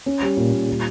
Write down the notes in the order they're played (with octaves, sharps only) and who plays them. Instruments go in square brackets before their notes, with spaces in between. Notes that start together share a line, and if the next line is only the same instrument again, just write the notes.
[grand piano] C#4
G3
A#2
A#2
G3